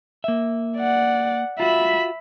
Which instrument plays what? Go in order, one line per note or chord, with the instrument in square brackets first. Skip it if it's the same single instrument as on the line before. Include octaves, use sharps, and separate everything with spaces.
[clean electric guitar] A#3 E5
[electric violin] D5 F#5
[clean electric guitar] F4 F#4 [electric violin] E5 B5